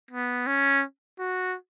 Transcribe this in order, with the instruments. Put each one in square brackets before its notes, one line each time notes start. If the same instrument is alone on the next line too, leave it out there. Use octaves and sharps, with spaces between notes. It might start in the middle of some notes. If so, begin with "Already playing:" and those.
[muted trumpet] B3
C#4
F#4